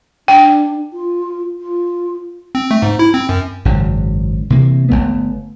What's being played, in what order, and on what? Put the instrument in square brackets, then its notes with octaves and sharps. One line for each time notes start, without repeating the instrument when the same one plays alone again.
[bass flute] D4 [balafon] G5
[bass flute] F4
F4
[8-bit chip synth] C4
A3
G#2
E4
C4
F#2
[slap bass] G#1 F#2 C#3
C3 E3 A#3
G1 F#2 A3 B3